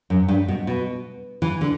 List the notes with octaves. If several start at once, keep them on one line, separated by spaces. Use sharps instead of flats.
F#2
G2
B2
B2
E3
D3